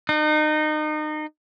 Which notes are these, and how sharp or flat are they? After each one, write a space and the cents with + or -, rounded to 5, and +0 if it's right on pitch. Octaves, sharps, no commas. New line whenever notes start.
D#4 -30